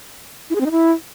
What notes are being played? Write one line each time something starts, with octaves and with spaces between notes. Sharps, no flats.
E4
G#4
C4
D#4
E4